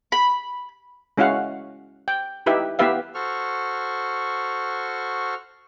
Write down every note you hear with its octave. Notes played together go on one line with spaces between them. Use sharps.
B5
G#3 C#4 E4 F#4 F5 F#5
G5
D#4 E4 G4 B4 E5
B3 E4 G4 B4 E5 F5
F#4 A4 C5 C#6 F6